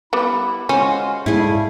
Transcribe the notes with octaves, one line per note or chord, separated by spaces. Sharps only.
G3 B3 E4
G#3 C#4 F4 F#4 C5
G#2 C#3 G3 A3 E4 G#4